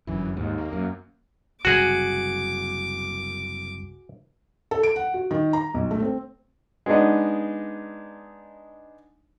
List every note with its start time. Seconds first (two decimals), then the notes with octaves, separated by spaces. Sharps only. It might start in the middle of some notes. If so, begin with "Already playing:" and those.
0.07 G1 F#2 E3
0.37 D#2 G#2
0.58 A#3
0.73 F#2
1.65 F#1 C2 F#4 G#4 D6
4.71 A4
4.83 D7
4.96 F#5
5.14 F#4
5.31 D#3
5.53 A#5
5.74 B1
5.91 A3
6.02 C4
6.86 G#3 B3 D4 D#4